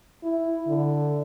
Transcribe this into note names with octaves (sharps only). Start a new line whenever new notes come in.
E4
D3